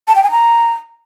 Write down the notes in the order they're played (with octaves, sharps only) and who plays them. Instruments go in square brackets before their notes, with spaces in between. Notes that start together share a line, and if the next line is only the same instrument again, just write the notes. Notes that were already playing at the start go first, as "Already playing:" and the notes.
[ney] A5
G5
G#5
A#5